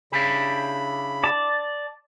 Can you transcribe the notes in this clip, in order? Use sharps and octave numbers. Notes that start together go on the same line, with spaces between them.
C#3 D4 E4 G4 B5
D5 A5